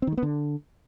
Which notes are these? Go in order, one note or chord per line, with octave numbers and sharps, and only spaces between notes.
C4
D#3
G#3
B3
D3